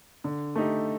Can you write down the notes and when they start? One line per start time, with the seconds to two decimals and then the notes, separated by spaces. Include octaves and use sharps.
0.24 D3
0.55 A3 D#4 G4